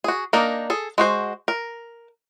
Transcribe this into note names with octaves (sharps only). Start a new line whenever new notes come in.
F#4 G#4
A#3 D4 D#4 A#4
G#4 A4
G#3 F#4 C5
A#4